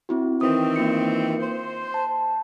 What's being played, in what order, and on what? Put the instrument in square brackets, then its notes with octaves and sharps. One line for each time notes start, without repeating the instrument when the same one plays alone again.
[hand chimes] C4 E4 F#4
[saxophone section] D#3 E3 C4 [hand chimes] D#6
[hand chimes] A#3 F4 C#7
[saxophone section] C5
[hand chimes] A5